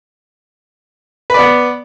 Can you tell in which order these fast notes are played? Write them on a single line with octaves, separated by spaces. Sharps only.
B4 D5 B3